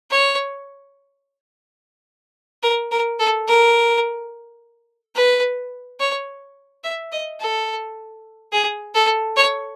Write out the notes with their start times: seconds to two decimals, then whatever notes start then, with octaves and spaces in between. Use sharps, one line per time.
0.11 C#5
2.63 A#4
2.91 A#4
3.19 A4
3.48 A#4
5.16 B4
6.00 C#5
6.83 E5
7.12 D#5
7.40 A4
8.52 G#4
8.94 A4
9.36 C#5